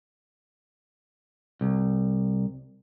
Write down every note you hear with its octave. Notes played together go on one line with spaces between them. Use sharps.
C2